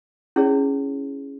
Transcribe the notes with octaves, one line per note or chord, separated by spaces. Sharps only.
C#4 E4 G#4 C#5